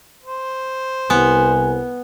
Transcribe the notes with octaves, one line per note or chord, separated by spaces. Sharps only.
C5
C2 B3 G#5